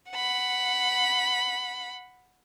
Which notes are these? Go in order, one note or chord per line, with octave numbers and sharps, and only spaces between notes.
F#5 B5